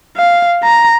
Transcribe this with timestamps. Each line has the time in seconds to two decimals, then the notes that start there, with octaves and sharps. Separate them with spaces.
0.17 F5
0.63 A#5